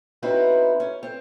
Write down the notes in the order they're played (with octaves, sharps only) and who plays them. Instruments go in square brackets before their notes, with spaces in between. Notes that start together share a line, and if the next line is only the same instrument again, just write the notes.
[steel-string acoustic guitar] C4 C#4 D#4 E4 F#4 B4
C#4
C4